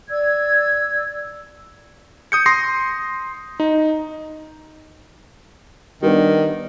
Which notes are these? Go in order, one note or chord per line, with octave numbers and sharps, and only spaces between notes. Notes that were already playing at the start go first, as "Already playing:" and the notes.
D5 E6 G#6
D#6 G6 C#7
C6 D#6 A#6 C7
D#4
D#3 G3 B3 D4